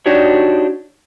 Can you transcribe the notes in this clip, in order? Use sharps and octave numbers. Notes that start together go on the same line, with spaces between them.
D4 D#4 F#4 G4 C#5 D5